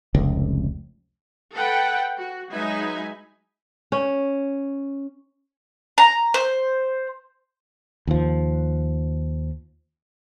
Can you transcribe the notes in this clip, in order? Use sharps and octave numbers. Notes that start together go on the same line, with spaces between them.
F1 C#2
A4 B4 F#5 G5
F#4
F#3 G#3 D#4 B4 E5 G#5
C#4
A#5
C5
D#2 F3